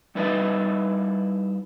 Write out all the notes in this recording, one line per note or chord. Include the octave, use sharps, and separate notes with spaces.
G3 D#4 E4 B4 D#5 A5